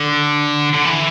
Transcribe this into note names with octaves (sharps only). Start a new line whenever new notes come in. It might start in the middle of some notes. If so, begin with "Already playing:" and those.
Already playing: D3
D3
E3